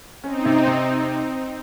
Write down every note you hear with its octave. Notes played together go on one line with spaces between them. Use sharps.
C4 C#4 D#4
C3
C3